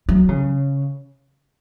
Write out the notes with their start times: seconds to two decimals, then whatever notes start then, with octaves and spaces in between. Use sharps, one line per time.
0.09 F#3
0.29 C#3